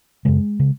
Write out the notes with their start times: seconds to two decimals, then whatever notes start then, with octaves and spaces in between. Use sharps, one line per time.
0.25 F#2 C#3 G#3
0.59 C#3